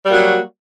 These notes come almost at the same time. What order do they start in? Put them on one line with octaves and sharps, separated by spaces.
G3 A#3 F#4 F#3